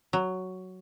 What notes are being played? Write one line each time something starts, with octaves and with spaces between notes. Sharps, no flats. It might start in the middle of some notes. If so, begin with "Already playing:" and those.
F#3